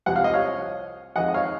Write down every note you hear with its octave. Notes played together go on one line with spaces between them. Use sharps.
C2 C3 F3 F#5
F5
D#5
C#5 F5
F2 D#3 G#3 D#5 F#5
D#5
C#5 F5